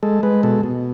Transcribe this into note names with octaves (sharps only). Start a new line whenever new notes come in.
G#3 A4
G#3 B4
B2 A4
B2